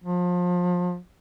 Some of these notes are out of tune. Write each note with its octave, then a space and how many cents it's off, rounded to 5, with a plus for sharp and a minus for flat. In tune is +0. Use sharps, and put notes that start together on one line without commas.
F3 +30